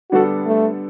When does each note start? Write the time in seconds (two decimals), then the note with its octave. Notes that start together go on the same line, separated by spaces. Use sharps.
0.11 D3 G3 B3 D4 F#4 A4
0.46 A3